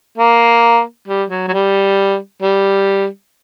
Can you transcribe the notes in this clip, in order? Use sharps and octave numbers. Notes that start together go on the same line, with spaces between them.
A#3
G3
F#3
F#3
G3
G3